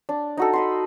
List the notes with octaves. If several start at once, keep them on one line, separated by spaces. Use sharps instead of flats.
D4
D#4 F#4 A4
D#5 B5 C6